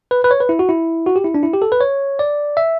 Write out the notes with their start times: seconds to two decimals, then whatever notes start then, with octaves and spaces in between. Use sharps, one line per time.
0.11 B4
0.24 B4
0.31 C#5
0.41 B4
0.49 E4
0.59 F#4
0.69 E4
1.06 F#4
1.16 G4
1.25 E4
1.34 D4
1.43 E4
1.53 G4
1.62 A4
1.72 B4
1.81 C#5
2.19 D5
2.57 E5